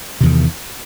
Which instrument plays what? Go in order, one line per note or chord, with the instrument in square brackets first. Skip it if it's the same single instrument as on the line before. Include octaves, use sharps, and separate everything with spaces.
[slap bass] C3
E2
D#3